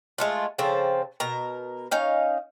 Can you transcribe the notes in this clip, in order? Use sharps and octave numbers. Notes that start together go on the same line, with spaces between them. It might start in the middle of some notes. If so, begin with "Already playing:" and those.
G#3 A3 F4
C#3 F3 C4 A4
B2 A#4 A#5
C#4 D#4 F5